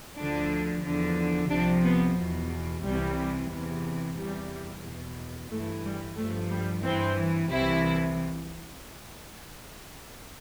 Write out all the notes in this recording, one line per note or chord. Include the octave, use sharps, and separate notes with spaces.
D2 D3 F3 D4
E2 D3 F3
C2 C3 F3 D4
B3
E2 B2
C2 C3 E3 G3
E2 C3 E3
E2 C3 E3 G3
E2 B2
G2 E3 A3
G3
G2 F3 A3
G3
G2 E3 C4
C2 C3 E3 E4